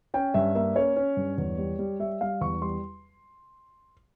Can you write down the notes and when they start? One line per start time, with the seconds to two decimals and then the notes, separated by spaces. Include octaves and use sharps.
0.14 C#4 G5
0.34 G2 E5
0.55 A#3 E5
0.75 C#4 C#5
0.96 C#4
1.17 G2
1.38 E2
1.58 G3
1.79 G3
2.00 G3 E5
2.21 G3 F5
2.41 E2 C#6
2.62 G3 C6